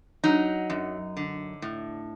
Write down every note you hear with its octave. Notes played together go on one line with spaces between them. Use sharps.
F#3 D#4
F#2
D3
A2